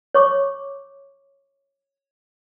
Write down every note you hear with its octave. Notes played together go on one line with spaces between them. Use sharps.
C#5 C#6 D6